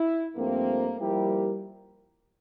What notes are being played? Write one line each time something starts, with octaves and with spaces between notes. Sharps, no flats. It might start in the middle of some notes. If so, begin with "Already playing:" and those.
Already playing: E4
G2 F3 A3 A#3 C4
F3 G3 A#3 E4 G4 A#4